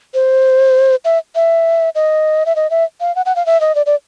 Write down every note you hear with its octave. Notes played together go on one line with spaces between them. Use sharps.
C5
E5
E5
D#5
E5
D#5
E5
F5
F#5
F#5
F5
E5
D#5
D5
D5